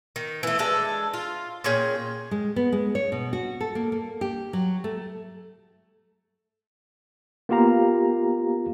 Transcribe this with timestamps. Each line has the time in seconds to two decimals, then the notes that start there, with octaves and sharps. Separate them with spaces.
0.16 D#3
0.43 E3 A3
0.59 G#3 D4 A4
1.14 F4
1.64 A#2 C#4 G#4 G5
2.31 G#3
2.56 B3
2.72 G#3
2.95 C#5
3.12 B2
3.33 F#4
3.61 A4
3.75 A#3
3.92 A#3
4.21 G4
4.53 F#3
4.84 A3
7.49 A#3 B3 F4 G4 F5 A#5